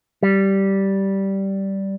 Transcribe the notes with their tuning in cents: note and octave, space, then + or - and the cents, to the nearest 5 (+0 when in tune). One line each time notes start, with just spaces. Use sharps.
G3 -10